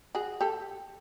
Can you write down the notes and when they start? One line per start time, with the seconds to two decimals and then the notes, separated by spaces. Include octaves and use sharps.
0.15 F#4 G#4
0.41 G4 A4